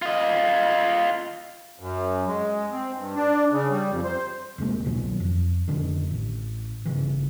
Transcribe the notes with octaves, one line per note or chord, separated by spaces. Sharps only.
F4 D#5
F#2
G#3
C4
G2
D4
C#3
G3
F2
C5
D#1 C3 G#3 A#3
C2 B2 D#3 F#3
F2
F1 B1 D3 D#3
A1
G1 C#3 E3